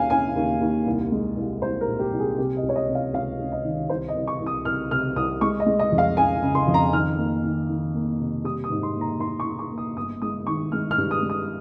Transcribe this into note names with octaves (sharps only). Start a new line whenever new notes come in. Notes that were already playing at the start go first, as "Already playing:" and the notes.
Already playing: D#2 C#4 F5 G#5
C#4 G#5
D#2
D#2
C2
G#3
C2
C2 C5
A#4
A#2
G4
C2
G#4
C3 G4
D#5
C#2
C#5
D#5
C3
F5
C#2 F5
C#2
D#5
D#3
C2 C5
D#5
C2
C#6
C2
D#6
C2 F6
C3 F6
C2 D#6
G#3 C#6
D#5
G#3
D#5
F2
F5
C#3 G#5
C#3
C6
F2
A#5
D#3 F6
A#3
D#3
D#3
A#3
C3
G3 D#6
D#6
G#2
C6
A#3
A#5
D#4 C6
C#6
D#4
C#6
A#3
D#6
G1 D#6
G#3 D#6
D#3 C#6
G#3 F6
F6
G2
D#6
G#3
D#6